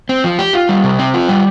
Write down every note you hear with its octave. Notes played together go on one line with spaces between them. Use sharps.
C4
F3
G4
F4
G3
C3
C4
F4
G3